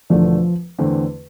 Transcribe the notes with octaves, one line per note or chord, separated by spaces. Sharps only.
E1 E2 D3 F3 A3 D4
E2 D3 A3 C4